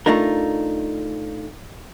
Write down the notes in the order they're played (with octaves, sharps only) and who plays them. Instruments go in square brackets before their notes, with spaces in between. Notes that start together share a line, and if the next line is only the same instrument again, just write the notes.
[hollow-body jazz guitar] A3 D4 D#4 F4 A#4